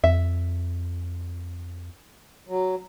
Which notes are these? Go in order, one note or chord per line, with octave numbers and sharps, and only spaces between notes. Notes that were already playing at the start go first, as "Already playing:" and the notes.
F2 E5
F#3